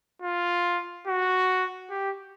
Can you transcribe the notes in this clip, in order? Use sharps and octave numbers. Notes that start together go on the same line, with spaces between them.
F4
F#4
G4